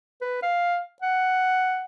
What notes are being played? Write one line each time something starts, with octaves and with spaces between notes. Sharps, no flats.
B4
F5
F#5